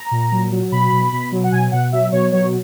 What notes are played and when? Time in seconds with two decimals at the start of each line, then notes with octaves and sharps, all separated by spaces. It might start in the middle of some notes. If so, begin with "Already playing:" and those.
Already playing: A#5
0.11 A#2
0.32 F#3
0.52 F#3
0.72 B2 B5
0.92 B2
1.12 B2
1.32 F#3
1.44 F#5
1.52 B2 G#5
1.72 B2 F#5
1.92 F#3 E5
2.12 B2 C#5
2.32 F#3 C#5